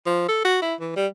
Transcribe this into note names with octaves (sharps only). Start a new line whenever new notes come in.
F3
A4
F#4
E4
E3
G3